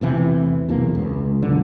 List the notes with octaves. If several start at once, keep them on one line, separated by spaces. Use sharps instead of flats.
A1 E2 C3 E3
B1 E2 C3 A#3
C#2
F1 B1 F#2 D3